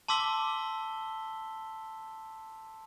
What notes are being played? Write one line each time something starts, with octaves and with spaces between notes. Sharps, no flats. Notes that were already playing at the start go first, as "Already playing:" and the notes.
A5 C6 D6 E6 B6 G7